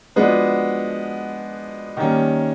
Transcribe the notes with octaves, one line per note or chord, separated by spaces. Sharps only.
F3 G#3 B3 D4 F#4
D#3 G3 A#3 C#4